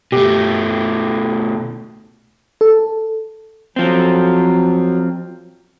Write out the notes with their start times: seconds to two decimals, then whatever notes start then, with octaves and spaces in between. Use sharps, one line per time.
0.12 B2 A3 G4
2.61 A4
3.76 F3 F#3 C4